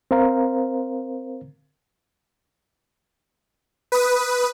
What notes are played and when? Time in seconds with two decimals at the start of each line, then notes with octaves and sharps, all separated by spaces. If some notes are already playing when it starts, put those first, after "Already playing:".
0.11 C4 A#4 C5 F5 A#5
3.92 B4 D#6